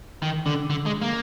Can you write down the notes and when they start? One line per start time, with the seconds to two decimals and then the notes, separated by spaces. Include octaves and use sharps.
0.22 D#3
0.46 D3
0.70 D3
0.86 G#3
1.02 A#3